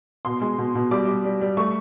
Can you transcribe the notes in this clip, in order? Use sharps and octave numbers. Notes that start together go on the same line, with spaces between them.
B2 C6
G#3
B2
B2
G3 D6
G3
G3
G3
A3 C#6